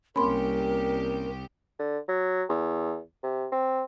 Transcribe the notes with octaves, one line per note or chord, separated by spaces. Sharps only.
C2 A#3 C4 C#4 G4 A#4 B5 C6
D3
F#3
E2
C3
C4